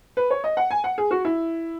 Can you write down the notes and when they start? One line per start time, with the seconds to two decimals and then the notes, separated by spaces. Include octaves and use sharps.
0.17 B4
0.31 C#5
0.44 D#5
0.57 F#5
0.71 G#5
0.84 F#5
0.98 G#4
1.11 F#4
1.25 E4